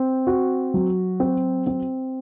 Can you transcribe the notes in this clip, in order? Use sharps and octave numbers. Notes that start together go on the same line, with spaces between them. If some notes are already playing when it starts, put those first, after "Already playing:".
Already playing: C4
F#4
F#3
C4
C4